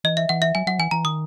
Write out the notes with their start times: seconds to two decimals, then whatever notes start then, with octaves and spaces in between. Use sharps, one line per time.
0.04 E3 D#5
0.17 E5
0.29 E3 F#5
0.42 E5
0.55 F#3 G#5
0.67 F#3 F#5
0.79 E3 G#5
0.91 E3 A#5
1.05 D#3 D#6